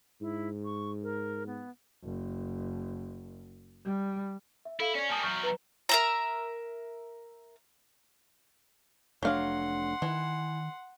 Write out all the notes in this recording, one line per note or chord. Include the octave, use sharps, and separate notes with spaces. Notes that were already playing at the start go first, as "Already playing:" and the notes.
G#2 E4
C#6
A#4
B3
F#1
G3
E5
E4 A4 F5
C#4 C#5 D5
G3 A#3 G#5 A5 D#6
E2 F#3 C#6 F6 G6
B4 A#5
A#4 E5 A#5
F1 F#3 A3 D4 F5 F#5 C6
D#3 E3